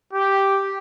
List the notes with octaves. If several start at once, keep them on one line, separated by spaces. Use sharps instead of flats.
G4